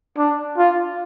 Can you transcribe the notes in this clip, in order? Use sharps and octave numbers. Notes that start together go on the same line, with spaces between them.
D4
F4